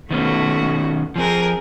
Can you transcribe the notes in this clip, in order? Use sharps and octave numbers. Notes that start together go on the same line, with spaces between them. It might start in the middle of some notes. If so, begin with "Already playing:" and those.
D#3 A3 B3 C#4 F#4
F3 C4 G#4 A#4